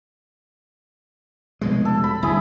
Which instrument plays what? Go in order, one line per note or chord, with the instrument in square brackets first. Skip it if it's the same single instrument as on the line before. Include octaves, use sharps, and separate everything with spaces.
[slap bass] F1 B2 G#3
[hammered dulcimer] A4
B5
[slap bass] G1 D2 [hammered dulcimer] E4 G#4